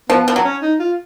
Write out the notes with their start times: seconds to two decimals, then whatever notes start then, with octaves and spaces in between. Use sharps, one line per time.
0.10 F3 B3
0.28 F3
0.36 F#3
0.45 C#4
0.62 D#4
0.80 F4